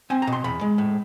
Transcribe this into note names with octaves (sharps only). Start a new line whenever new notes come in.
C4 G#5
A#5
B2
C6
E2 B5
G#3
A2